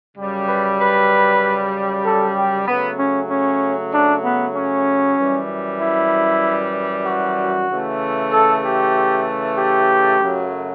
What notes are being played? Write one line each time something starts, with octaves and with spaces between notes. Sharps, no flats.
F#2 C#3 G3
B4
B4
A4
G4
C#3 F#3 A3 B3
C#4
C#4
D4
B3
C#4
F#2 E3 G3
E4
F#4
C#3 E3 A3
A4
G4
G4
F#2 C#3 F#3 A3